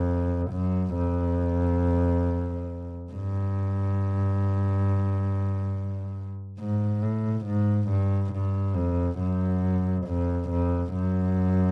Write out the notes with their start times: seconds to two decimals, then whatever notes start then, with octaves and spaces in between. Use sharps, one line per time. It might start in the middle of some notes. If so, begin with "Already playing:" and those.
Already playing: F2
0.51 F#2
0.95 F2
3.12 G2
6.59 G#2
7.02 A2
7.46 G#2
7.90 G2
8.33 G2
8.76 F2
9.19 F#2
10.06 F2
10.50 F2
10.94 F#2